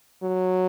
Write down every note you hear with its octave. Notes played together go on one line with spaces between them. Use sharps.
F#3